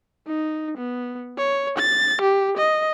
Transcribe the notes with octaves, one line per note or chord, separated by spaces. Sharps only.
D#4
B3
C#5
A6
G4
D#5